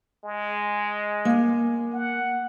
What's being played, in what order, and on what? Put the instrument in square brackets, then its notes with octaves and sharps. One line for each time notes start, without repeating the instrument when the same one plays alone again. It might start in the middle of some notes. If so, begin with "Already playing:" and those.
[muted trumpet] G#3
[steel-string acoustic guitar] A#3 G#5
[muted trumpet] F#5